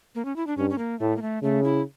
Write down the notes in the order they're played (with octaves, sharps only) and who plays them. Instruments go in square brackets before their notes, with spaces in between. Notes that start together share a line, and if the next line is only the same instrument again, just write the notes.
[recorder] A#3
C#4
E4
D4
[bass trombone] G2 [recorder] C#4
[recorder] C#4
A#3
[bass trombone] A2 [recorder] A3
[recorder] A#3
A3
[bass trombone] C#3 [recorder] A3
[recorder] E4